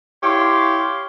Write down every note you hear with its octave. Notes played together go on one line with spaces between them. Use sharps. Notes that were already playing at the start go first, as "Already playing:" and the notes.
E4 G4 C#5 F5 C6